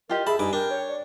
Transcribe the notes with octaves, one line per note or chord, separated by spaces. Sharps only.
F4 G4 A#4 D#5
G#4 E5 A5 B5
G2 D#4 G#5 D6
D4 A#4 G5
C#5
D5